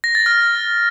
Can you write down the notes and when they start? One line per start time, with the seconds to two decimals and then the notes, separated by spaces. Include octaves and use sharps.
0.04 A#6
0.15 A6
0.26 F6